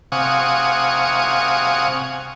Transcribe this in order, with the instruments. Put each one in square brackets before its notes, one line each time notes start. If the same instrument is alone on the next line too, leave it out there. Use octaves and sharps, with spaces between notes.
[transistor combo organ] C3 F5 F#5 G#5 C#6 D#6